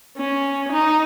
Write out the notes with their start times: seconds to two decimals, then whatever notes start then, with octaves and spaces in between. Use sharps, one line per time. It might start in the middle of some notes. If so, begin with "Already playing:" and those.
0.17 C#4
0.72 D#4